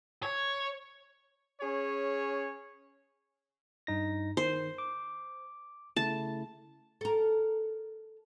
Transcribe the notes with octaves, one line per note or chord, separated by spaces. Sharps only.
C#5
C#4 G#4 C#5
G2 D#4 A#6
D#3 C5 C7
D6
C#3 A3 E4 A5
A4 A#4